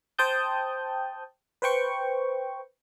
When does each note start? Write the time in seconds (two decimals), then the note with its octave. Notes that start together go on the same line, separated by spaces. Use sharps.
0.19 C5 G5 A5 D#6 G6
1.62 B4 C5 G5 C#6